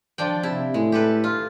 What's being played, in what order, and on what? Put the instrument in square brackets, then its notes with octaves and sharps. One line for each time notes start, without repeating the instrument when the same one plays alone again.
[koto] F3 D4 G5
[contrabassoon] C3 [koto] E4
[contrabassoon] A2 [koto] G#3
[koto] G4 A4 B4
F4